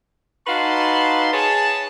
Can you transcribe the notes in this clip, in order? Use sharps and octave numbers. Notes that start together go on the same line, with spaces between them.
D#4 F#4 B4 F5 A5 C6
G#4 B4 C#5 A5